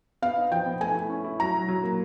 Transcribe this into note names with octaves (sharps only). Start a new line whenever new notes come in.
B3 F5
D#4
F3 G5
B3
A3 G#5
E4
C#4
E4
F#3 A#5
F#3
F#3
A#3